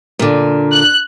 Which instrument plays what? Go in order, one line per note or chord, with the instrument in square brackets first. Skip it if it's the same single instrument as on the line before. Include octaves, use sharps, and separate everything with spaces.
[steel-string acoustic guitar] A#2 D3
[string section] F#6